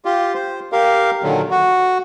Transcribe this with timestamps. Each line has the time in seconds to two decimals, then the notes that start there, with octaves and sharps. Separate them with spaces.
0.05 F4 G4
0.34 C5
0.72 G4 A#4 F5
1.23 A#2 D3 D#3 F#3
1.51 F#4